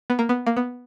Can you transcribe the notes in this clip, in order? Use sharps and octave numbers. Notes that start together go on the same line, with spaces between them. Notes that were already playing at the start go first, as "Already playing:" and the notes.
B3
A#3
B3
A#3
B3